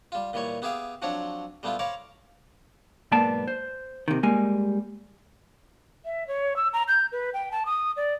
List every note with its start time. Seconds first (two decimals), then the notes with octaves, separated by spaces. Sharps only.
0.12 G3 F4
0.33 A#2 E3 G3 C#5 C#6
0.62 B3 G4 G#4 E5 F5 G5
1.02 F3 F#3 C4 D4 C5 C#5
1.63 G3 A3 B3 E4 F4
1.79 C5 C#5 F5 A#5 B5 D6
3.12 B1 G#2 A#3 B3 D5 A5
3.48 C5
4.08 C3 D#3
4.23 G3 G#3 A#3 G#5
6.04 E5
6.27 C#5
6.56 E6
6.73 A#5
6.88 G6
7.12 B4
7.34 G5
7.51 A5
7.66 D#6
7.97 D5